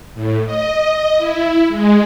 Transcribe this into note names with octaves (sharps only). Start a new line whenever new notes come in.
A2
D#5
E4
G#3